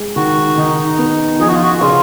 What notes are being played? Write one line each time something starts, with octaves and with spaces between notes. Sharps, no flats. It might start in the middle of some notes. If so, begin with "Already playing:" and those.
Already playing: G#3
D#3 F#4
D#3 D#4
B3
F3 G#4
F#4
F4
F#4
C#3 F4